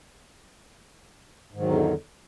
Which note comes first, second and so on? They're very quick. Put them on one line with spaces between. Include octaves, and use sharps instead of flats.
G#2 D#3 F#3 E2 D3